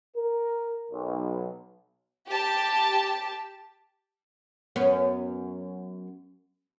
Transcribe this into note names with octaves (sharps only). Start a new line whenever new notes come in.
A#4
B1
G4 A5
F#2 B3 C#4